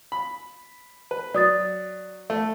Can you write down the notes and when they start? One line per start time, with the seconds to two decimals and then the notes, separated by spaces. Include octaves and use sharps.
0.12 B5
1.11 B4
1.34 F#3 D5 D#6 A6
2.30 A3